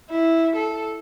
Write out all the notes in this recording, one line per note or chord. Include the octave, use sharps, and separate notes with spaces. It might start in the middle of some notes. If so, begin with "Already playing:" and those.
E4
A4